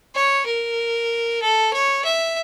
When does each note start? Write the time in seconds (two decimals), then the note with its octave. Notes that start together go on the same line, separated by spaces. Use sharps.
0.15 C#5
0.46 A#4
1.42 A4
1.73 C#5
2.05 E5